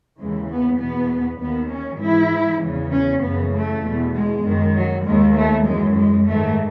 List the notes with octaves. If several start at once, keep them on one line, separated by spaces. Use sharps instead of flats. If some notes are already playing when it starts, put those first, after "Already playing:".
D#2 C#3 E3 G#3
B3
E2 B2 B3
D#2 D#3 B3
C#4
G#2 E3 E4
E2 C#3 E3
C#4
F#2 C#3 E3 B3
A3
E2 B2
G#3
F#2 D#3
F#3
D#2 D#3 G#3
A3
F#2 E3 G#3
G#3
G#2 D#3 A3